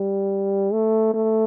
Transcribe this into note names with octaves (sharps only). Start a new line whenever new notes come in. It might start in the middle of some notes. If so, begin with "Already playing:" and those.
Already playing: G3
A3
A3